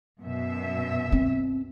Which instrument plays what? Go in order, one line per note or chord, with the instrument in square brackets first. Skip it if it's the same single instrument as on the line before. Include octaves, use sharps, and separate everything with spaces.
[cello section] F#2 B2 E5
[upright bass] C4